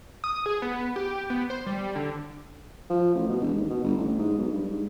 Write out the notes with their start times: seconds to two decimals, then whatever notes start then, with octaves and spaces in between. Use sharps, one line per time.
0.24 D#6
0.46 G#4
0.62 B3
0.96 G4
1.30 B3
1.50 C5
1.66 G3
1.95 D3
2.90 F3
3.15 A1
3.29 B2
3.41 E1
3.56 D#2
3.70 B2
3.84 G1
3.97 A1
4.19 G#2
4.38 B1
4.52 G2
4.70 G#2